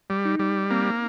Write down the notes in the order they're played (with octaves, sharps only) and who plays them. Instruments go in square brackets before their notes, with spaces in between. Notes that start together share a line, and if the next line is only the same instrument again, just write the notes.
[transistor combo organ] G3
[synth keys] D#4
[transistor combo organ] G3
[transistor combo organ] A#3 [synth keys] C4